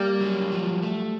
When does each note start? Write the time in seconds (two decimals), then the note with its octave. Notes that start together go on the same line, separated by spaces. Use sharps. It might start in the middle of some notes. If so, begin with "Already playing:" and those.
Already playing: G3 A#3
0.21 F#3
0.52 F3
0.83 A3